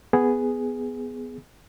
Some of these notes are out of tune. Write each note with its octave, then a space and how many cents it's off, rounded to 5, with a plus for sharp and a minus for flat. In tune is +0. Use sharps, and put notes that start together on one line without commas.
B3 +10 G#4 +0